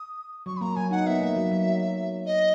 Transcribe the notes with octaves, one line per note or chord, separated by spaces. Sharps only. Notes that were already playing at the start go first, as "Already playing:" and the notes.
Already playing: D#6
F#3 C#6
B5
A#3 A#5
F#3 G#5
D#4 F#5
B3 E5
A#3
F#3
F#3
D#5